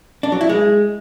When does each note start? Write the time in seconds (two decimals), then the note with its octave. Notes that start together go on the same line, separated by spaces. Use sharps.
0.23 D4
0.32 F#3
0.41 E4
0.49 G#3